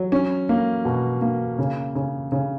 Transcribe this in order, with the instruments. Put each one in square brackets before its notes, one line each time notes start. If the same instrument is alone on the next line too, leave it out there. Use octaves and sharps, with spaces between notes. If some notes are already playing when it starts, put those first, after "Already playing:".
Already playing: [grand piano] F#3
C#4
A#3
B2
A#3
C#3
C#3
C#3